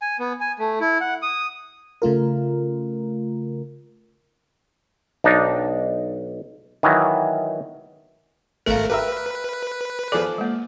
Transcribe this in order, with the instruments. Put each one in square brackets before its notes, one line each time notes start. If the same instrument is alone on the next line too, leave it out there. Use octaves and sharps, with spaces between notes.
[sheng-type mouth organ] G#5
B3
G#5
A3
E4
F#5
D#6
[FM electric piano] C#3 A3 F4 A#4
[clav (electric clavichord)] B1 D4 D#4
D#3 E3 F#3
[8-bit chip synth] G#1 A3 A#4 [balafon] A4 F5
[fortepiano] G4 A#4 E5 [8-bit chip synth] B4
[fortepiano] F3 G#4 D5 [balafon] A4
[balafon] G#3 A#3